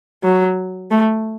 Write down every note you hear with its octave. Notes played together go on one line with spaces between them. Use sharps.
F#3
A3